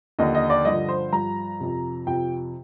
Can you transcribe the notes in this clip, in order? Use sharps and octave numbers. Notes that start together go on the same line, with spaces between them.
D#2 D3 F3 D#5
D#5
D5
G2 D3 F3 D#5
C5
G2 F3 A#5
F2 C3 F3
F2 C3 F3 G5